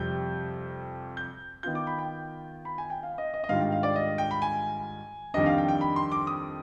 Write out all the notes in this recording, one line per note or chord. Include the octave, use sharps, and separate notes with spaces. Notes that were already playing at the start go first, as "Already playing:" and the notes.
Already playing: F2 C3 G3 G6
G6
D#3 B3 F4 G6
D6
B5
G5
B5
G#5
G5
F5
D#5
D#5
D#5
G#2 D#3 G3 D4 F4 F5
G5
F5
D5
D#5
G5
B5
G#5
F2 D#3 G3 D4 D#5
F5
G5
G5
B5
C6
D6
D#6